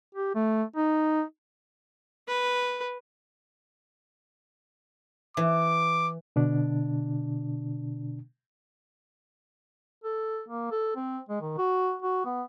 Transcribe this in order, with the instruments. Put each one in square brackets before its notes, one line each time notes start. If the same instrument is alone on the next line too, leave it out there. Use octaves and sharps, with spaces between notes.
[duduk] G4
A3
D#4
[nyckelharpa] B4
[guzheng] E3 [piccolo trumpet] D6
[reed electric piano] B2 D3 D4
[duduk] A4
A#3
A4
C4
G#3
D#3
F#4
F#4
B3